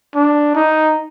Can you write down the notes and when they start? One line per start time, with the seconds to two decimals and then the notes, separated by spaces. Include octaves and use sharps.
0.15 D4
0.56 D#4